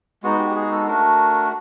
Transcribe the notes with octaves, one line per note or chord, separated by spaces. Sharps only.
G#3 B3 D#4 F#4
G4
G4
G#4
A4
A3 D4 F#4 A#4